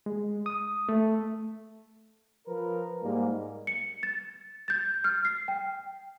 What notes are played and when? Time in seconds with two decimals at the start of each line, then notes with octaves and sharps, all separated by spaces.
0.06 G#3
0.46 D#6
0.89 A3
2.47 F3 A#4 B4
3.03 G#2 G3 G#3 A#3
3.67 C#7
4.03 A6
4.68 G6 A6
5.04 F6
5.25 C7
5.48 G5